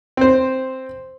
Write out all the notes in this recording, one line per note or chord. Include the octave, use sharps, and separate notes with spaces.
C4 C5